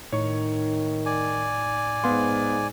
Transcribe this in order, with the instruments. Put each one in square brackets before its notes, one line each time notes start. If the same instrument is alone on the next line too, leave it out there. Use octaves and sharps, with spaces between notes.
[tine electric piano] A2 D#4 C#6 [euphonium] D#3 [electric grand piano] C#5
[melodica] D5 G#5
[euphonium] G#2 [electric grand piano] B3 F5 C6